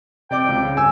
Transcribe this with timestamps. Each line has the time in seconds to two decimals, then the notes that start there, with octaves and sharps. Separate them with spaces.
0.31 C3 D5 G5 D6
0.48 C#2 C3
0.65 C#3
0.77 G1 G#5 E6